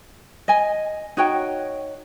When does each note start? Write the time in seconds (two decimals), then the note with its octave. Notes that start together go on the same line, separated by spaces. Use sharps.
0.48 D#5 G#5
1.17 D#4 F#4 C#5 G5